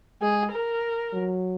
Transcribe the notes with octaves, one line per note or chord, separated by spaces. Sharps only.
G#3 G#4
A#4
F#3